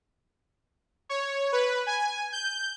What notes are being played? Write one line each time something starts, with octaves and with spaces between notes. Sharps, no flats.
C#5
B4
G#5
G6